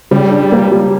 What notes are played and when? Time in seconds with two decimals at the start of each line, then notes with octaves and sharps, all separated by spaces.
0.11 C#3 G3
0.31 D4
0.52 A#3
0.72 G3